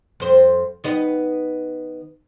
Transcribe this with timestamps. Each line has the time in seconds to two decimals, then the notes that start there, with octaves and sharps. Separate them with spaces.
0.20 F2 C5
0.84 D#3 B3 D#5